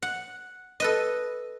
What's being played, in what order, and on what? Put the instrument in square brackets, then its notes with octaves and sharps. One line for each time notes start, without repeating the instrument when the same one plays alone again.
[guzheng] F#5
A4 B4 D#5